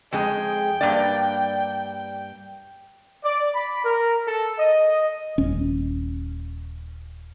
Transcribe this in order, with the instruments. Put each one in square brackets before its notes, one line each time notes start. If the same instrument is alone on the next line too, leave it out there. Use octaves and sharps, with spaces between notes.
[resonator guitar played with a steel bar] F2 G#3 G#4 [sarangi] G5
[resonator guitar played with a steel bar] G2 A#3 D5
[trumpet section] D5
B5
A#4
A4
D#5
[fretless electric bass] D#1 C#4